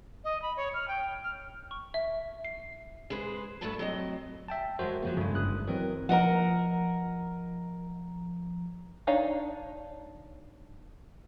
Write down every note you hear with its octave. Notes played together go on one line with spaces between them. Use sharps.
D#5
B5
C#5
F6
G5
F6
C#6
E5
C7
G#3 G#4 B4 C5
G2 A3 B3 D4 B4 A5
F#3 C4 D#5
E5 G5 A5
F#3 G#3 F#4 A#4 C5
C#3 F3 F#3 A#3
G2 C#3 G#3 A3
G1 D#6 F#6
E3 F#3 C4 A#4 D#5
F3 A#4 D#5 F#5 A#5
D4 D#4 C#5 F5